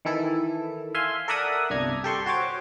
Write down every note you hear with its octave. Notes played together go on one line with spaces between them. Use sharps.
D#3 E3 E4 A4
E5 F5 G#5 C6
A4 A#4 D5 E5 F#5 D#6
G1 C2 D4 A#5 G#6
G4 A4 C6 C#6
F#4 C5 C#5 D6